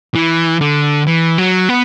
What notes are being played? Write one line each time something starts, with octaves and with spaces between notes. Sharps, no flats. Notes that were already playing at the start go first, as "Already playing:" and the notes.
E3
D3
E3
F#3
B3